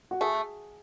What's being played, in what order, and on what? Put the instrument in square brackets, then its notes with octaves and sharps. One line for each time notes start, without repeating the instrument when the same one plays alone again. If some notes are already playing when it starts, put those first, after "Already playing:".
[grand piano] F#4
[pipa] A3 [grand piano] G#4